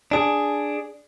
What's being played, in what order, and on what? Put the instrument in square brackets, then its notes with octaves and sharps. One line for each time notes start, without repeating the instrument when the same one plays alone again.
[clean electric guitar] D4 G#4